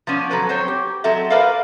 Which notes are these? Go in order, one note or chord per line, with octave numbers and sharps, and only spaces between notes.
F3 B3 C#4 D5
F#3 A4 B4 C#5
F#3 C4 C5 C#5
G4
F#3 C4 A4 D#5 E5
A#4 B4 D5 E5 F5